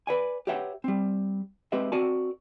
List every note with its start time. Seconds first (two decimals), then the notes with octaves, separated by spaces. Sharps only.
0.07 B4 D5 G#5
0.47 G4 B4 C#5 E5 F#5 G5
0.84 G3 C4
1.72 G#3 C4 G4 B4 D#5 E5
1.92 C4 F#4 A#4 D5 G#5 A5